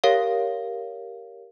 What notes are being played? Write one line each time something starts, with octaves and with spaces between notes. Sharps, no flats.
G4 A#4 C#5 F5